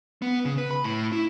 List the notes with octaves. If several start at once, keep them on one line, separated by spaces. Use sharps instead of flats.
B3
C#3
B4
B5
A2
E4